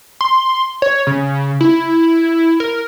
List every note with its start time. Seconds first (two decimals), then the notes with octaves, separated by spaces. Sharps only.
0.21 C6
0.82 C#5
1.07 C#3
1.61 E4
2.60 A#4